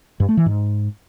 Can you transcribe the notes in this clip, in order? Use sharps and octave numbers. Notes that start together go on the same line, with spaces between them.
G2
A3
E3
G#2